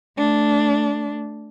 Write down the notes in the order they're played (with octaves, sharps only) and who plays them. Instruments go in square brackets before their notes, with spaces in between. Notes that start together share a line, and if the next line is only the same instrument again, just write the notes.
[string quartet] A3 D4